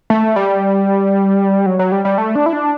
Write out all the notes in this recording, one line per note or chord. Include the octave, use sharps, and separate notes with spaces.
A3
G3
F#3
F#3
G3
G3
A3
D4
E4
D4